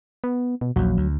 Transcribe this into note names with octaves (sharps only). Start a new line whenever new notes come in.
B3
B2
A#1 D#2 F#3
D2